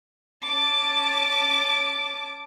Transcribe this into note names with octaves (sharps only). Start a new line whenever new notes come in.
C#4 A5 D6